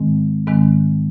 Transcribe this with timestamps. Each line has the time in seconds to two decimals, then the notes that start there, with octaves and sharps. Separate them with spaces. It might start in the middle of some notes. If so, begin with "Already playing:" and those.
Already playing: G#2 D#3 G#3 C4
0.47 G#2 D#3 G#3 C4